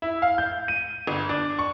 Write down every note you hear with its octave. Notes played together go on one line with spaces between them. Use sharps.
E4
F5
G6
D#7
G1
D4
C#6